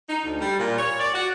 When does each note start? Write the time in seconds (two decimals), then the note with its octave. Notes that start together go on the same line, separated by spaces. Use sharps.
0.09 D#4
0.25 D2
0.40 G3
0.59 A#2
0.79 C#5
0.99 D5
1.14 F#4